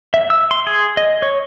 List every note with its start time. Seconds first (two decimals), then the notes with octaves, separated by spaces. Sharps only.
0.14 E5
0.30 E6
0.51 C6
0.67 G#4
0.97 D#5
1.22 C#5